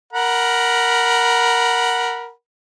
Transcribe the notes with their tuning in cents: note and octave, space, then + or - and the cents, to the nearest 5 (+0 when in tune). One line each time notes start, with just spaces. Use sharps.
A#4 +0 F#5 +0 B5 -20